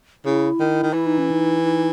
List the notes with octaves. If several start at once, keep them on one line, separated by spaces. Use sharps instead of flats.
C#3 E4
D#3
D#3
E3 E4
D#4
C#4
D#4
D#4